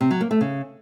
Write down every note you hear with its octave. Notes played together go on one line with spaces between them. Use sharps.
C3
F#3
A#3
A3
C#3